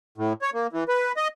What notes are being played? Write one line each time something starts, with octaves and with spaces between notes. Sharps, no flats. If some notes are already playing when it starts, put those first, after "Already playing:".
A2
C#5
A#3
E3
B4
D#5